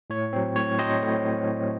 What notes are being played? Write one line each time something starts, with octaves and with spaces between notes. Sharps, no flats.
A2 C#5
F#3 C4
A2 C#5
F#3 C4 C5 D#5
A2